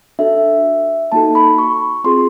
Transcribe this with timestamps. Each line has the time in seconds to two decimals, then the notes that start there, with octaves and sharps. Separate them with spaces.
0.19 D4 F#4 A4 E5
1.12 A#3 D#4 F#4 A4 A5
1.35 B5
1.58 C#6
2.04 C4 F4 G#4 C6